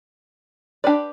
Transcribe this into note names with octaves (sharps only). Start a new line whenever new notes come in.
D4 G4 B4 D5